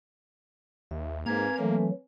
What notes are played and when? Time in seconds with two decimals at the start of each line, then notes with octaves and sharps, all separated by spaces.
0.91 D#2 E5
1.26 G#2 A#3 C4 B4 G#5 A#5 G#6
1.59 E3 F#3 A3